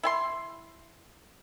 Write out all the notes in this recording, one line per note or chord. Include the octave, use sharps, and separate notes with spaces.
E4 G#5 C6